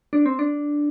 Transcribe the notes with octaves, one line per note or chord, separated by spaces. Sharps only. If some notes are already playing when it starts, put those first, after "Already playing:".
D4
C4
D4